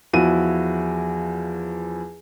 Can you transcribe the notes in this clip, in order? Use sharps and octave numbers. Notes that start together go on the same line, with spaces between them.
E2 F3 E4 F#4 D#7